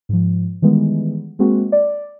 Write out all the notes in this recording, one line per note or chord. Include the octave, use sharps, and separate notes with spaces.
G#2 F3
D#3 E3 G3 G#3 B3
G#3 A#3 C4 F#4
D5